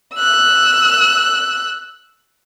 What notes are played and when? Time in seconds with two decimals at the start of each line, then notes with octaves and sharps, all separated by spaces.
0.15 E6 F#6